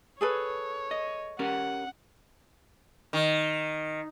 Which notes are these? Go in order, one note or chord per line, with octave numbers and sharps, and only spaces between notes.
G#4 A4 B4 C#5
D#5
C#4 G4 A#4 F#5
D#3